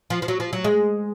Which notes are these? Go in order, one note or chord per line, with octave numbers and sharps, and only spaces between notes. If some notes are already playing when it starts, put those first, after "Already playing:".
F3
F3
F#3
F3
F#3
G#3